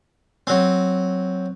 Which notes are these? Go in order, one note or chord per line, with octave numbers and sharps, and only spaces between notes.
F#3 C4